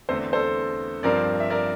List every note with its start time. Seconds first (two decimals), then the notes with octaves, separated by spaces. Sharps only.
0.09 E2 D3 A3 C4 A4 C5
0.33 A4 C5
1.03 G2 F3 C4 A#4 D5
1.40 E5
1.50 A#4 D5